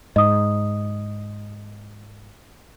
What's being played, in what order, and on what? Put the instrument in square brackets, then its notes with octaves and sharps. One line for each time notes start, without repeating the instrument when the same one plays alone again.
[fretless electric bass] G#2 [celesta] D#5 D#6